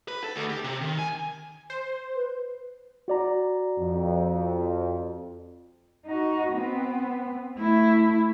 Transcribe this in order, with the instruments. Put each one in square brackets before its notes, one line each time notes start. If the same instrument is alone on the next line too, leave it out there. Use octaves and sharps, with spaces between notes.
[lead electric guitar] B4
A4
D2
G4
C3
D#3
G#5
[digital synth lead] C5
[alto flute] B4
[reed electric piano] F#4 D5 A#5
[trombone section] F2
[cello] D#4 F#4
B3 C4
A3 E4